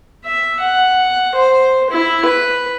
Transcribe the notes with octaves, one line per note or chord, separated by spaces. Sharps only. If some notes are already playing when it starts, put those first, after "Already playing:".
E5
F#5
C5
E4
B4